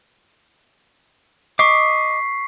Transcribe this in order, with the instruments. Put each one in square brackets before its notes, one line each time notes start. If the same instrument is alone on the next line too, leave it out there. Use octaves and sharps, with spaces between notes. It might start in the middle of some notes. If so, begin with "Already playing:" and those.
[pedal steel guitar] D#5 D6 [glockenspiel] C#6 B6 C7